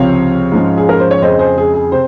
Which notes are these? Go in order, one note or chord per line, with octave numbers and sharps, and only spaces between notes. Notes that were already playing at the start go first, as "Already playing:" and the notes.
Already playing: C#2 C3 F3 C4 C#5 F5
G#2 F3 G#3 C#4
G#4
A#4
C5
C#5
F2 C#3 G#3 C5 D#5
G#4 C5
G#4
G#4
C3 C5